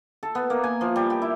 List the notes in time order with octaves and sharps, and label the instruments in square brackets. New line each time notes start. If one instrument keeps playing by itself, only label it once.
[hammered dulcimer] A4
B3
A#3
G#5
F3
G3
G4
E4